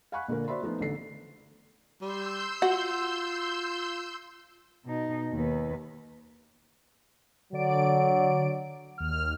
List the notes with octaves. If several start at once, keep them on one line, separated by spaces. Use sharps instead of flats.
F5 F#5 G#5 B5 C#6 F#6
A#2 D3 A#3 A#4
F#4 C5 D5 E5 B5 C6
F3 A3 B3 D#4 F4
A1 D3 A4 C7
G3 C6 E6 G6
F4 F#4
B2 D#4
D#2 B4
D3 F#3 D5 D7
D#2 F6